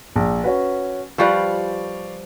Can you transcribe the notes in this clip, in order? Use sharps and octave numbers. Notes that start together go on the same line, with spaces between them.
A#1
C#4 F#4 B4
F3 G3 B4 D5 F5 C#6